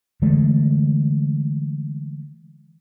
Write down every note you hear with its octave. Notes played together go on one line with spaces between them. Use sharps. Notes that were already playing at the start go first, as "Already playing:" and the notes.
D3 E3 G#3 A3